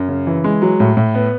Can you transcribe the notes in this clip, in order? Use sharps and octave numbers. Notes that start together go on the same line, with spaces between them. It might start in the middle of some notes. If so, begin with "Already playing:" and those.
Already playing: F#2
C#3
E3
G#3
F#3
A2
A2
B3